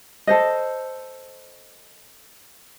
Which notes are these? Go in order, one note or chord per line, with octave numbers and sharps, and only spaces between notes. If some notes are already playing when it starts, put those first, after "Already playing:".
A4 C5 D#5